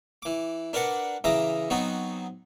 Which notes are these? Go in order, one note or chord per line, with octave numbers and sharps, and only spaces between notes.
E3 D6
D4 A#4 B4 D5 F#5
C#3 E3 E5 A#5 D6 D#6
F#3 B3 C4 D#4 F#4